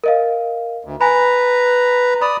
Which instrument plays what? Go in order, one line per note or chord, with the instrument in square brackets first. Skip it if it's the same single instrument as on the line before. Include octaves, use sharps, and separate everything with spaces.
[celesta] A#4 D#5 F5
[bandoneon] D2
[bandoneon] B4 A#5 [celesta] G#5 B5
[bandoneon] D5 D#6 [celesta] B5